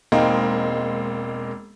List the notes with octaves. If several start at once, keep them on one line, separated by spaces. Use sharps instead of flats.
E1 G#3 A#3 C4 D#4